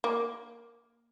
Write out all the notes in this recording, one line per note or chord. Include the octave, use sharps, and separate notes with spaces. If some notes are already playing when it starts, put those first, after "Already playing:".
A#3